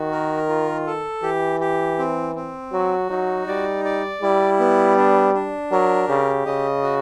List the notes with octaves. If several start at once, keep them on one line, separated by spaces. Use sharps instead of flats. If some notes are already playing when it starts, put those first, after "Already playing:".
Already playing: D#3 F#4
A#4
F4
A4
E3 G4
G4
C4
C4
F#3 F#4
F#3 D#4
G3 D5
D5
G3 E4
B3
D4
D4
F#3 A#4
C#3 G4
C#3 D#5
F#4